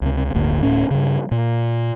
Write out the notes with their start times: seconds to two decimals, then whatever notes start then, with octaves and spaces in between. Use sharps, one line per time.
0.02 C#2 C3
0.34 D1 G1 D2 A#3
0.63 D1 A2 C#4
0.91 G2 C#3
1.31 A#2